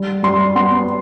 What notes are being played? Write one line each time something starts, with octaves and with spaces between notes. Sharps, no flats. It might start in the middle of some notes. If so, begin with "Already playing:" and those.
Already playing: G3
G3 C6
B3 C6